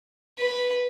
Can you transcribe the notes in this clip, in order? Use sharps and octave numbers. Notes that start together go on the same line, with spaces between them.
B4